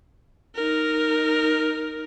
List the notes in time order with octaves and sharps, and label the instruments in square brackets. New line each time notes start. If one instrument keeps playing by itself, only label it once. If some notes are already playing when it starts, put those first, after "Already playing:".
[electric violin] D#4 A#4